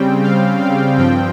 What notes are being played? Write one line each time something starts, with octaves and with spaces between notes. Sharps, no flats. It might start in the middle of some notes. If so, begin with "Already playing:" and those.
Already playing: C#3 G3 C4 G5
F5
F5
G2 F3 C4 G5